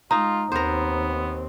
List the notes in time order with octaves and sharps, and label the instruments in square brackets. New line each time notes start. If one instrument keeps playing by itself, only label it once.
[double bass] G#3 [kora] D#4 [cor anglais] F4 [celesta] A#5
[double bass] D#2 C4 [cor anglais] B3 [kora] A#4 C5